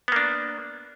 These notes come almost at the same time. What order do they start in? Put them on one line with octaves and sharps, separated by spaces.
B3 A#3 D4